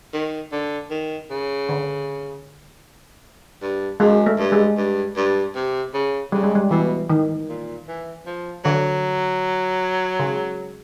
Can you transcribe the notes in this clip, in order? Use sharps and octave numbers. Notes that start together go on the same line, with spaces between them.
D#3
D3
D#3
C#3
D3
G2
F#2 G#3
A3
G2
G#3
G2
G2
C3
C#3
C#3 G3
G#3
G3
B2 E3
D#3
A#2
E3
F3
D3 F#3
C#3